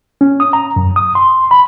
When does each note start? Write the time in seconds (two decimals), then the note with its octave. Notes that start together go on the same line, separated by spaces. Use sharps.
0.21 C#4
0.40 D#6
0.53 A#5
0.76 F#2
0.96 D#6
1.15 C6
1.51 B5